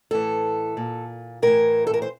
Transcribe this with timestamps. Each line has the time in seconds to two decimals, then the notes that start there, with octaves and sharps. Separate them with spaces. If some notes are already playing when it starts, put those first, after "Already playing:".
0.11 A2 E3 A4
0.77 A#2
1.42 A2 E3 A#4
1.87 A4
1.94 A#4
2.02 C5